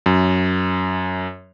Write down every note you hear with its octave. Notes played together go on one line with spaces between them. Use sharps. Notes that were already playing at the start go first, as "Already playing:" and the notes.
F#2